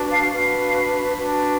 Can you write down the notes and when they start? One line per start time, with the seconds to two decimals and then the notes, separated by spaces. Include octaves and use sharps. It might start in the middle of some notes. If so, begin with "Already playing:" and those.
Already playing: D4 F#4 B4
0.10 F5
0.31 D4 F#4 B4 F5
1.18 D4 F#4 B4